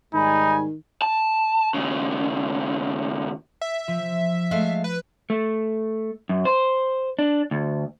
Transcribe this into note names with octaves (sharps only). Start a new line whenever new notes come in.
G#2 D#3 G3 D#4 G#5 B5
A5
D#2 C#3
E5
F3
G#3 A3 F5
B4
A3
F#2
C5
D4
D2